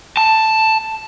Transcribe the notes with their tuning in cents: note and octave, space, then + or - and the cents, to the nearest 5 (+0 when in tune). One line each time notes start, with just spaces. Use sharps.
A5 +5